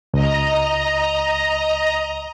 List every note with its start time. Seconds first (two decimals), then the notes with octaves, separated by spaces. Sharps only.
0.14 C#2 D#5 A#5